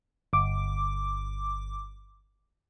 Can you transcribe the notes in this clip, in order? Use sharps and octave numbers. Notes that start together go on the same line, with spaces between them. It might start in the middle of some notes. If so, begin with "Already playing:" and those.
G1 D6